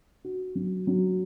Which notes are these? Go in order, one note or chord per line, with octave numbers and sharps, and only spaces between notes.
F#4
F#3
F#3